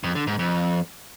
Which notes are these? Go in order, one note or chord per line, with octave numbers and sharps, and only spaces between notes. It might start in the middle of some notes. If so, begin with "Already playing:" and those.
F2
D3
G#2
F2